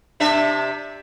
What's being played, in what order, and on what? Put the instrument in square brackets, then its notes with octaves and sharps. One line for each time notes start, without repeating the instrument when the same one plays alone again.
[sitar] C3 D4 E5